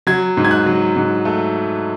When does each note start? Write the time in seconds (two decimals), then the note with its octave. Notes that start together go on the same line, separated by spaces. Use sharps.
0.07 F#3 G#6
0.37 G#2
0.45 G#6
0.51 F#6
0.66 F#3
0.96 G#2
1.25 A3